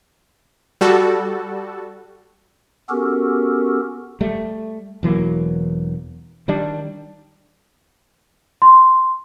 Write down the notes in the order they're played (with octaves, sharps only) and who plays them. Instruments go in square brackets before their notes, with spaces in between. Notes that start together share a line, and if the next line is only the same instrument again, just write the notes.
[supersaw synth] G3 F#4 A4
[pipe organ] B3 C#4 F#4 G4 A4 A#4
[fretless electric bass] G3 A3
E1 E3 F#3 A#3
D#3 G3 D4
[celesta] C6